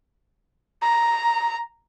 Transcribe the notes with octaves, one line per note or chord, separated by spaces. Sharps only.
A#5